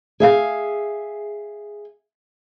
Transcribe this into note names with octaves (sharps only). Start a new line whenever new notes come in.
G#4 E5 F5